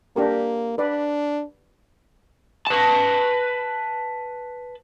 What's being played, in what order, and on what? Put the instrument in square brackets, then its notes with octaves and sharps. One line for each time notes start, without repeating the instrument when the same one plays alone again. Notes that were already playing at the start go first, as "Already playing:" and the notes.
[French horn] A#3 [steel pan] D4 G4 A#4
[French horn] D4 [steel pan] B4 D5
[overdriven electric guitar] B4 A5